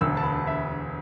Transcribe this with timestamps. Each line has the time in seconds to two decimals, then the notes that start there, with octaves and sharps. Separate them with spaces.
0.01 E1 D2 D3 E6
0.17 A5
0.23 B5
0.47 E5